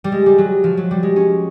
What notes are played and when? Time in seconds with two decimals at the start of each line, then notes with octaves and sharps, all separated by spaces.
0.04 G3
0.12 G#3
0.26 G3
0.38 F#3
0.64 F3
0.77 F#3
0.91 G3
1.03 G#3
1.16 C#4